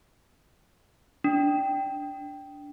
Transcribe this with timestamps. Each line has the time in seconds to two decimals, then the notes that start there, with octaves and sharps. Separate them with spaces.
1.24 D4